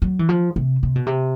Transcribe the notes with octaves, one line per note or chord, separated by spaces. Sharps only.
F#3
E3
F3
C3
C3
B2
C3